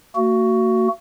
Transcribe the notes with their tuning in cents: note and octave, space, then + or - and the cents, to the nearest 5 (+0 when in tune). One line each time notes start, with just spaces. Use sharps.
A#3 -45 F#4 +10